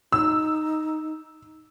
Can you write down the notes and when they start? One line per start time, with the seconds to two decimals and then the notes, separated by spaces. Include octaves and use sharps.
0.12 D#4 E6